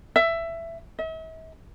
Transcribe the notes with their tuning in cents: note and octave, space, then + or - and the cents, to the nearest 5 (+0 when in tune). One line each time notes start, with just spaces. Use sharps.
E5 +15
E5 -45